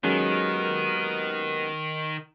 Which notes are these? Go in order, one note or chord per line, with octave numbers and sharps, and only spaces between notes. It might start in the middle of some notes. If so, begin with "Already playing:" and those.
D#2 D#3 F#3 G#3 B3 C#4 A#4